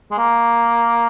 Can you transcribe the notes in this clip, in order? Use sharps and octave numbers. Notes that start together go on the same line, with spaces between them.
G#3
A#3